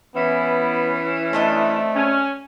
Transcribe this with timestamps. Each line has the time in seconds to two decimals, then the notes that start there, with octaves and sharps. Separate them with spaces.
0.15 E3 B3 C#4 E4
1.33 A3 C4 D4 D#5
1.96 C#4